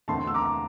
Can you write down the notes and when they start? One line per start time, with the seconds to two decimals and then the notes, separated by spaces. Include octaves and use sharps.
0.08 E2 D3 A3 C4 A5 C6
0.27 E6
0.34 A#5 D6